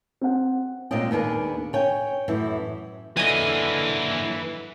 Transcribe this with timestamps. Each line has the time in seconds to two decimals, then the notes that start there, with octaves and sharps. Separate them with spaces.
0.21 C4 F#5
0.91 A#2 G#3 C4 D5 D#5 G5
1.11 D#2 B3 D4 G#4 A#4
1.73 C#5 G5 G#5
2.28 F#2 A2 E3
3.17 D3 F#3 A#3 B4 D#5 E5 G#5